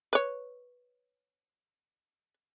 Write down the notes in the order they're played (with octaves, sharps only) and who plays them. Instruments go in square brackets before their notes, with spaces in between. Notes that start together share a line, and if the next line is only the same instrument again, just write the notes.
[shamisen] B4 C#5